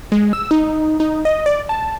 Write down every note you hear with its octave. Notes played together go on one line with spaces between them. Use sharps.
G#3
E6
D#4
D#4
D#5
D5
A5